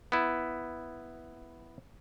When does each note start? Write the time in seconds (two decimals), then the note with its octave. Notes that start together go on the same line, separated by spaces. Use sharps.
0.12 B3 E4